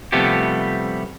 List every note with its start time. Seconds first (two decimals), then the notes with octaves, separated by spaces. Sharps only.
0.12 C3 F3 G3 A3 B3 G4